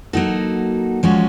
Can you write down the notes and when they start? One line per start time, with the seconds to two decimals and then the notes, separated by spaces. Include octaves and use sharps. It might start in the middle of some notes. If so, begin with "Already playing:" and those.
0.13 F#3 A#3 D#4 F#4 A4
1.03 F3 G#3 C#4 F#4